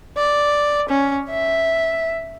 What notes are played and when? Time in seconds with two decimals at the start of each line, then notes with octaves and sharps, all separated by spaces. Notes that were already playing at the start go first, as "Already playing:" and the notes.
0.17 D5
0.89 C#4
1.30 E5